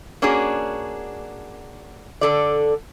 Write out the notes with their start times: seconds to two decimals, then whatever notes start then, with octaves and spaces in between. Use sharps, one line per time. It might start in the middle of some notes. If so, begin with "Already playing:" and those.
0.22 A#3 C#4 D4 F#4 G#4
2.21 D3 A4 D5